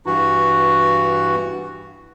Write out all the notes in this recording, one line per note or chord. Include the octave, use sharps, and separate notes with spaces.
G2 E3 F#4